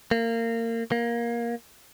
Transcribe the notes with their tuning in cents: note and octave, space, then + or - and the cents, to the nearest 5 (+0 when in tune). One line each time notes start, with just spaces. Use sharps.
A#3 -25
A#3 +15